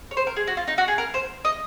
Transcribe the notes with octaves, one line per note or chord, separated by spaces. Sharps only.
C#5
C5
A#4
G#4
F#4
F4
D#4
F#4
G#4
A#4
C5
D#5